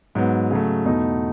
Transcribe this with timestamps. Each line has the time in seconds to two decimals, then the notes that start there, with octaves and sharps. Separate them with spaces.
0.15 G#2 F#3 B3
0.51 C#3 F#3 A3
0.86 E2 B2 A3 D#4